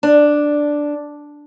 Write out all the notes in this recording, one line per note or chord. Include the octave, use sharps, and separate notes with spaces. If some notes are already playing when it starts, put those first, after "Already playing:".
D4